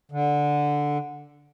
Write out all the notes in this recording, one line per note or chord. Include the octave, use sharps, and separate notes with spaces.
D3